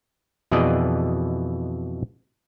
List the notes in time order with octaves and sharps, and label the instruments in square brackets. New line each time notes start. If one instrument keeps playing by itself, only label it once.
[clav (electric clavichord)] F2 B2 E3 G#4 D5 D#5